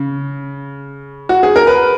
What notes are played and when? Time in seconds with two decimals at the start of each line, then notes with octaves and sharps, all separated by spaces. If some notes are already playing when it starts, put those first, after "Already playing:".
Already playing: C#3
1.29 F#4
1.43 G#4
1.56 A#4
1.67 B4